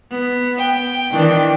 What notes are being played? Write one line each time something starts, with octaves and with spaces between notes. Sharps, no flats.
B3
G5
D#3 E3 D4